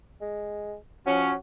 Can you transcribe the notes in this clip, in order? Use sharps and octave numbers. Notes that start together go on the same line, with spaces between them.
G#3
F3 C#4 F#4